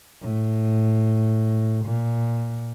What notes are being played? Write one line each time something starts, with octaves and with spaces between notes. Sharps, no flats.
A2
A#2